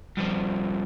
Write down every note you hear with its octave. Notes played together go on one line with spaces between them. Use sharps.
G2 F3